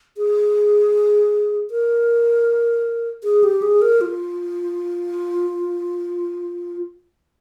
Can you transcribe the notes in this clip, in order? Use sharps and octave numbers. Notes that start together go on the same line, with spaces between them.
G#4
A#4
G#4
G4
G#4
A#4
F4